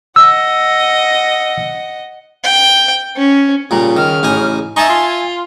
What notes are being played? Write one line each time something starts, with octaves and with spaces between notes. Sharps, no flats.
D#5 F#5 E6
G5
C#4
A#2 C#3 G3 A#5
D#3 F6
A1 D#4 G#5
D#4 E5 G#5 A5 C#6
F4